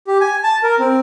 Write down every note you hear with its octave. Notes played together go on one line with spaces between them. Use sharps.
G4
G#5
A5
A#4
C4